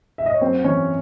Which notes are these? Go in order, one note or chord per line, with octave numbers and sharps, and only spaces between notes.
E5
D#5
C#5
F#2 C4 C5
E3 C#4 C#5